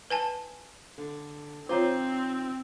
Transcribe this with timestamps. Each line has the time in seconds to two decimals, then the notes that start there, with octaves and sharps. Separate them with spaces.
0.10 B4 G#5 A5
0.98 D3
1.69 D#3 C4 F4 C5 C#5 A#5 D6